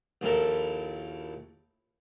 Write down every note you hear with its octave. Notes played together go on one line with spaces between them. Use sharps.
A#1 D#2 E4 A4 A#4